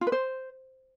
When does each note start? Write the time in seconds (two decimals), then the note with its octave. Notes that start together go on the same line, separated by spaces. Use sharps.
0.01 F4
0.07 B4
0.12 C5